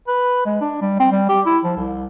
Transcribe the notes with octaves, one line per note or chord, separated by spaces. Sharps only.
B4
G#3
D4
G3
C4
G3
G4
E4
F3
C2